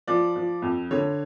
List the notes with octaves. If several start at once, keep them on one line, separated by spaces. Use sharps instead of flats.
F3 D5
F3
F2
D3 C#5